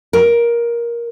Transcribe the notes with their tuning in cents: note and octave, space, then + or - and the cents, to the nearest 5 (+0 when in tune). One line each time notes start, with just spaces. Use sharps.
A#4 +15